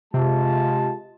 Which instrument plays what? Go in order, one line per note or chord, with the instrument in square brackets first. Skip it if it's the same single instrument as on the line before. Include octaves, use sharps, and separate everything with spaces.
[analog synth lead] C3 [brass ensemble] G#3 F4 A5